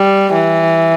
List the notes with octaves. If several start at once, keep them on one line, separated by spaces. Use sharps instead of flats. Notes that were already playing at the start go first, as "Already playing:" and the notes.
Already playing: G3
E3